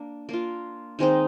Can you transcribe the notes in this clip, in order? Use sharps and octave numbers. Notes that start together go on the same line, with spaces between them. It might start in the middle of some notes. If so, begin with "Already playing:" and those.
Already playing: A#3 D4
A#3 D4 F4
D#3 G#3 C4 D#4